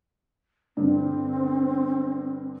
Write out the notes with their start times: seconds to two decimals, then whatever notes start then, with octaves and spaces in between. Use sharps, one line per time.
0.77 G2 D3 C4